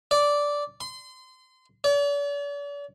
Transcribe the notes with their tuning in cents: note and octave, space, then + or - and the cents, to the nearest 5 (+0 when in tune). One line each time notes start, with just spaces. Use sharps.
D5 -10
C6 -30
D5 -45